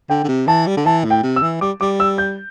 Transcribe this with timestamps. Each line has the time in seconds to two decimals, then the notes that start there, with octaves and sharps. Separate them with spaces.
0.10 D3 G5
0.24 D3
0.28 C3
0.47 E3 A5
0.67 G3
0.77 D3
0.86 E3 A5
1.05 A2
1.10 G5
1.23 C3
1.36 E6
1.42 E3
1.61 G3 D6
1.81 G3 D6
2.00 E6
2.18 G6